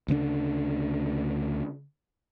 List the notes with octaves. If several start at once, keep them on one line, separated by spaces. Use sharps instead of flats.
D2 C#3 C4 D4